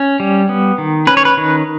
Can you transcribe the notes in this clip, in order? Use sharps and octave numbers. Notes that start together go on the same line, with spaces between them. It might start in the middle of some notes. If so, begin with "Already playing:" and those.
Already playing: C#4
G3
B3
D#3
C#4 B4
C#5
B4
D#3